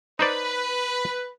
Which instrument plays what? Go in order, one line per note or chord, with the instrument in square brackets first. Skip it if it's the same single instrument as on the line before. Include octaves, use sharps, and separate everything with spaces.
[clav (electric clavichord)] D#4 C5 D5 [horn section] B4